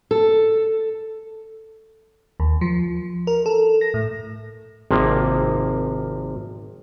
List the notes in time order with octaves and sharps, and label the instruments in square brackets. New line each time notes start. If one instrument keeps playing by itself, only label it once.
[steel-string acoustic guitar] A4
[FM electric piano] D#2
F3
A#4
A4
A#6
A2
[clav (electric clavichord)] G#1 C3 F3 A#3